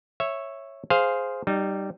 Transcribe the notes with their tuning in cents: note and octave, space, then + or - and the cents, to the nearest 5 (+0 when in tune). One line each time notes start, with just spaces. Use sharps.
C#5 -10 E5 +0
G#4 +0 C5 +0 F5 +0
G3 -10 D#4 -25